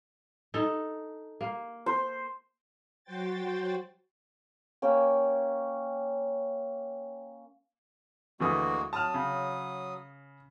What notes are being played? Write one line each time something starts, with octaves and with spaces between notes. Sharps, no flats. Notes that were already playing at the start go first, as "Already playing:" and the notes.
D#4 A4
A#3
C5
F#3 F#4 C5 G5 A6
A#3 C#4 G5
D2 E3 G#3 A#3 F#4 D#6
F#3 A5 D#6 F6
C#3